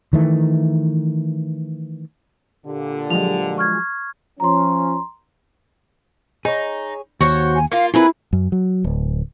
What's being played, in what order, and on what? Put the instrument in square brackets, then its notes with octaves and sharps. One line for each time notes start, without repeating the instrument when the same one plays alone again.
[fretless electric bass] D#3 E3 A3
[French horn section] A#2 D3 G4
[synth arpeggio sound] F3 F#3 G#3 [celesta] F7
[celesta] C#6 F6 G#6
[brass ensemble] F3 C#4 [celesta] A#5 C6
[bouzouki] D#4 [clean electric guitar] G#4 C#5
[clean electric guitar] D#2 [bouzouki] F#4 C5 C#5
[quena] G#5
[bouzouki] A#3 F4 [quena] F5
[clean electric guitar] B3 C4 F4 [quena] E4 [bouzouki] G#4 A#4 B4
[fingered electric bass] F#2
F#3
D1